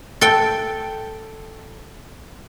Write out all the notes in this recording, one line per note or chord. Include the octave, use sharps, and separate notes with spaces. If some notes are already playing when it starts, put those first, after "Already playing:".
A4 G5